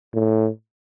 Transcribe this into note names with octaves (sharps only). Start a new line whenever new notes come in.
A2